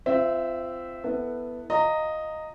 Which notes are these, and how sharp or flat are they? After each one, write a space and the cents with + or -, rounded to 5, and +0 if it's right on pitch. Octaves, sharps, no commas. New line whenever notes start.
C4 -20 F4 -20 E5 +0
B3 +0 E4 +0 A4 +20
F4 +5 D#5 +0 A#5 -15